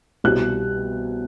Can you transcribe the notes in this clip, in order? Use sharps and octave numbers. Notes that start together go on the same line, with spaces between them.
C2 B2 G3 F#6